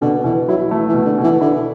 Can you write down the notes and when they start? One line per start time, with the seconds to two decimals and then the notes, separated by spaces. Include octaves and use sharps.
0.02 B2 D3
0.24 B2 E3
0.48 F#3 E4
0.71 E3 A3
0.89 E3
0.94 B2
1.05 D3
1.18 B2
1.24 E3
1.41 D3 E4